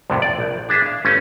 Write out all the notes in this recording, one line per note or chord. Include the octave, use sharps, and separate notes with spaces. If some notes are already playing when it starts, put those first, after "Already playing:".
C2 F2 A2 C3
D5
A#1
D4 G#4 E5
F5
G1 A3 C#4